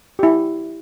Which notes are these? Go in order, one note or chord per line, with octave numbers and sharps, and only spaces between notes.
E4 G4